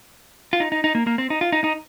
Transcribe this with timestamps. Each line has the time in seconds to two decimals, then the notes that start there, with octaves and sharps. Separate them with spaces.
0.53 F4
0.60 D#4
0.72 D#4
0.84 D#4
0.95 A#3
1.07 A#3
1.18 C4
1.30 D#4
1.41 F4
1.52 D#4
1.64 D#4